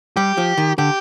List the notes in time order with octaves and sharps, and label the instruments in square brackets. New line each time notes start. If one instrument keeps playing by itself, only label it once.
[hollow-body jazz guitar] G3 [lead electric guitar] G4
[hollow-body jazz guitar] F3
D#3
[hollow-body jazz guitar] D3 [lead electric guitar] G4